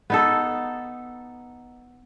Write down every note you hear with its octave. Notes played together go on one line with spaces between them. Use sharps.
B3 D#4 A4